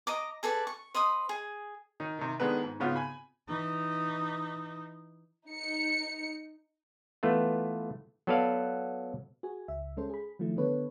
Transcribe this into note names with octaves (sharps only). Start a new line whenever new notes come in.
D#5 A#5 D6
G#4 A4 B4 D5
C#6
C5 D#5 B5 D#6
G#4
D#3 D#4
C3 D#3
D#3 G#3 B3 D4 A4 B4
G#2
G#2 C#3 B3 F4 F#4
G#5 B5
E3 D#4
D#4 C#7
E3 A3 B3 F4
F#3 B3 A4 B4 D5 F5
F#4 G#4 G#5
C#2 E5
G#3 C#4 A4 C5
G#4 B5
D#3 F3 F#3 A3 E4
D3 B3 D4 A4 B4 C#5